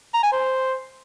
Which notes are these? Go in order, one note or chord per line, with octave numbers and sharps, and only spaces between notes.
A#5
G#5
C5